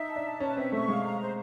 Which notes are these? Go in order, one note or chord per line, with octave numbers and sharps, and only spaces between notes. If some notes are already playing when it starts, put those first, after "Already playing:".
Already playing: D#4 E5
A5
D4
A5
C#4 B4
C4 E5
A3 C#6
G#3 F5
A#5
C5